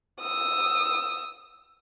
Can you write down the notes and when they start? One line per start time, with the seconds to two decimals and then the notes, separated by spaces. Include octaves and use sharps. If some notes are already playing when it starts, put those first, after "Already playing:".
0.21 D#6 E6